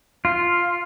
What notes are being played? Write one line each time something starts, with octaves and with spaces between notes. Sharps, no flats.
F4